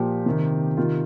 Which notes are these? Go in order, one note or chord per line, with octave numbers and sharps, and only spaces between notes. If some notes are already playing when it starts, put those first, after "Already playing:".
Already playing: A#2 F3 G4
C3 D#3
C3 D#3 F4